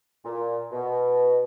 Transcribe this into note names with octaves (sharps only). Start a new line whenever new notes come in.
A#2
B2